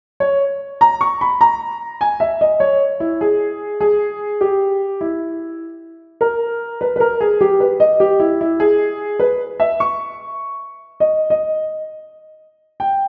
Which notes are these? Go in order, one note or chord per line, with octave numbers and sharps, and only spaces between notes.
C#5
A#5
C#6
B5
A#5
G#5
E5
D#5
C#5
E4
G#4
G#4
G4
E4
A#4
B4
B4
A#4
G#4
G4
B4
D#5
G4
E4
E4
G#4
B4
E5
C#6
D#5
D#5
G5